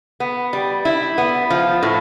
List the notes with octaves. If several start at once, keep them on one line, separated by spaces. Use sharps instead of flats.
B3
G3
E4
B3
F3
A2